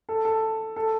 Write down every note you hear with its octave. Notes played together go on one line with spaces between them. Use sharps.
A4
A4
A4